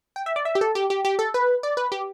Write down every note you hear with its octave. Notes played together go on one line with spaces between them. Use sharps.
G5
E5
D5
E5
G4
A4
G4
G4
G4
A4
B4
D5
B4
G4